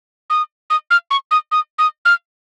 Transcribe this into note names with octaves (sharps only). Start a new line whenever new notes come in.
D#6
D#6
F6
C#6
D#6
D#6
D#6
F6